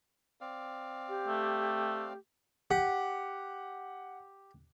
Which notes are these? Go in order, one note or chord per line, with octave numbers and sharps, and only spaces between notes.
C4 D5 F5
G4
A3
G4 F#5